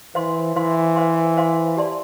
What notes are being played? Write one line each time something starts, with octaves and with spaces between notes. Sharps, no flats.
E3 C5 F5 C6
E3 C5 F5 C6
C5 F5 C6
C5 F5 C6
G4 D5 A5 C6